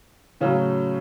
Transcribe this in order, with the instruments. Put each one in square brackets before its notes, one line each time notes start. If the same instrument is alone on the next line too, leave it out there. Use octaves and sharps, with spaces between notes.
[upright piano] A2 C#3 F#3 C#4